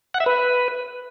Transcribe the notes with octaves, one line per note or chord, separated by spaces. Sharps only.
F#5
E5
B4